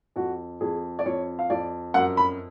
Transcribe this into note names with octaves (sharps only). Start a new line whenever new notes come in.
F2 F#4
F2 G#4
D5
F2 C#5
F5
F2 D5
F#2 F#5
B5